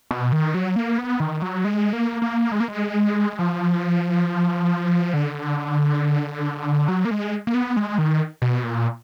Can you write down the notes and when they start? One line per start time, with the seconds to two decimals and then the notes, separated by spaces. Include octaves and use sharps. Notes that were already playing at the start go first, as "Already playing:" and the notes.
0.11 B2
0.32 D#3
0.54 F#3
0.76 A#3
0.98 B3
1.20 D#3
1.42 F#3
1.64 G#3
1.93 A#3
2.22 A#3
2.52 G#3
2.60 A#3
2.68 G#3
3.39 F3
5.14 D3
6.88 F#3
7.05 A#3
7.11 G#3
7.47 A#3
7.54 B3
7.77 G#3
7.98 D#3
8.42 B2
8.63 A#2